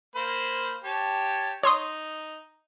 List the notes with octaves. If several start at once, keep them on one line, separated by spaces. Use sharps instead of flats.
A#3 C5 B5
G4 C#5 A5
D#4 C#5 C6 D#6